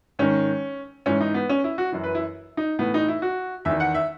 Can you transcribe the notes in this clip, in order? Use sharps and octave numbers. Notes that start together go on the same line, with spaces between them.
G#2 D#3 C#4
G#2 E3 C#4
D#4
B3
C#4
E4
F#4
F#2 E3
B4
E4
D#4
A2 E3 B3
D#4
E4
F#4
E2 D#3 E5
F#5
E5